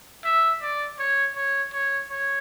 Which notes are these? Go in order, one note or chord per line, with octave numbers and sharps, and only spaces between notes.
E5
D5
C#5
C#5
C#5
C#5